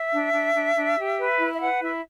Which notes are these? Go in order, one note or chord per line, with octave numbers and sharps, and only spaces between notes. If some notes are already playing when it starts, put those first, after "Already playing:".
Already playing: E5
D4
D4
D4
D4
G4
B4
E4
E5
B4 F#5
E4 E5